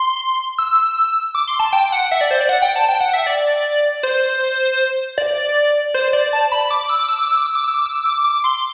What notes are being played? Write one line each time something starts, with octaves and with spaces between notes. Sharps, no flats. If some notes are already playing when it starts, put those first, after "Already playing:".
Already playing: C6
E6
D6
C6
A5
G5
F#5
E5
D5
C5
D5
F#5
G5
A5
G5
F#5
E5
D5
C5
D5
C5
D5
A5
B5
D6
D6
E6
D6
E6
D6
E6
D6
E6
D6
E6
D6
E6
D6
D6
C6